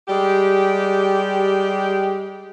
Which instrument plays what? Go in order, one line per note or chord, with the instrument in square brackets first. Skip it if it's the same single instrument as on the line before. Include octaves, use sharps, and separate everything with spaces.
[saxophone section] G3 G#3 G4